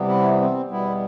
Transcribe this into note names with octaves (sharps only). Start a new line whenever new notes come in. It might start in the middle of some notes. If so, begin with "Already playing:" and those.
Already playing: C3 E3 G3 B3
E4
C4
E2 B2 G3 B3 E4